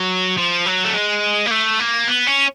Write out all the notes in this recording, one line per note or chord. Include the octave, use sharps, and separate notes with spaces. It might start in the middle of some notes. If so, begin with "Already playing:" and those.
Already playing: F#3
F3
F#3
A3
G#3
A#3
A3
A#3
B3
C#4